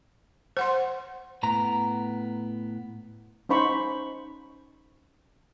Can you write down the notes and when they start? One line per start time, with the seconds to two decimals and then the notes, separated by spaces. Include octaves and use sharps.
0.57 C5 F#5 C6
1.43 A2 B3 A#5
3.49 C#4 D#4 C5 B5 C#6